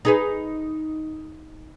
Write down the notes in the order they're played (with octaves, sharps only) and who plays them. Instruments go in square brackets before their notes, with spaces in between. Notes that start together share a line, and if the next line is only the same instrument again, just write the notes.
[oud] D#4 G#4 B4